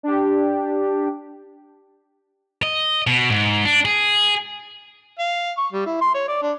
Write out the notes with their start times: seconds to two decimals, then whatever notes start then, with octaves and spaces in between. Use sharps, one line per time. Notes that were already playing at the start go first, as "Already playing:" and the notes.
0.03 D4 G4
2.63 D#5
3.07 B2
3.30 G#2
3.65 D4
3.85 G#4
5.19 F5
5.57 C#6
5.72 G3
5.86 E4
6.01 C6
6.14 C#5
6.28 D5
6.42 D4